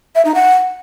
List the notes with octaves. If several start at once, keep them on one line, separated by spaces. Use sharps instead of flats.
E5
D#4
F#5